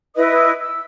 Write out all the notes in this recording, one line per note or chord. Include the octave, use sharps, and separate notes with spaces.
E4 B4 D#5 D#6
E6